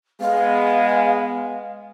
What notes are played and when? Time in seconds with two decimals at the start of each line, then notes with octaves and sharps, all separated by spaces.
0.21 G#3 B3 F5